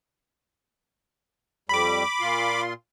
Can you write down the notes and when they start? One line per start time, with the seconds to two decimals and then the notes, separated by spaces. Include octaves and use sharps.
1.69 F2 G3 B5 D6
2.20 A#2 F4 C6